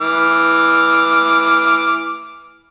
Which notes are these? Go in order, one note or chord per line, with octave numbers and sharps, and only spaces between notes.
E3 D6 F6